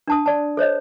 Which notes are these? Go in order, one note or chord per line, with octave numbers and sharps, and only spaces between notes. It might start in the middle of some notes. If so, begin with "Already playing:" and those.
D4 A5 D#6
D5 A5
A4 C5 C#5 D#5